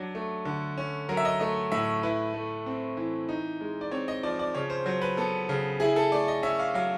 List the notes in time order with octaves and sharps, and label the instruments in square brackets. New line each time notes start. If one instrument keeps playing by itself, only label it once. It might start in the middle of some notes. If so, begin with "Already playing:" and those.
Already playing: [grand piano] F#3 D4
A3
D3
C#4
F#3 A#4
E5
D#5
A3 D#5
A2 E5
E4 B4
A3
C4
E3
D#4
G#3
D5
C4 C#5
D#5
F3 D5
D5
C#3 C#5
C5
F#3 C5
B4
B3 A4
C#3
E4 G#4
A4
A3 D5
D#5
C#4 E5
F5
F#3 F5